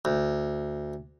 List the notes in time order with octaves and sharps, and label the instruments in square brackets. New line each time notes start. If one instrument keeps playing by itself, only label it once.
[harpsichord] D2